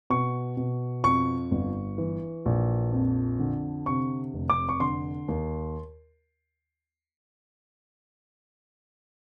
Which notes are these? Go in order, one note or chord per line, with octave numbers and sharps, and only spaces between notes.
B2 C#6
B2
F2 C#6
G1
E3
A#1
F2
D3
C3 C#6
F1
D6
C#6
D3 C6
D#2